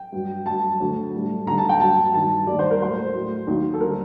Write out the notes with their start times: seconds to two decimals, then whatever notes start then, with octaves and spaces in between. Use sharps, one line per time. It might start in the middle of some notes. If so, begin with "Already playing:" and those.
Already playing: G5
0.12 G2 F#3
0.46 G2 F#3 A5
0.80 D2 D3 F#3
1.14 A2 G3
1.46 D#2 D3 G3 A#5
1.58 A5
1.69 G5
1.80 G2 F#3 A5
2.13 G2 D#3 F#3 A5
2.47 D#2 D#3 G3 D5
2.59 C5
2.71 A#4
2.81 A2 F#3 C5
3.14 A2 F#3
3.47 D#2 D#3 F#3
3.74 A4
3.81 D3 G3 A#4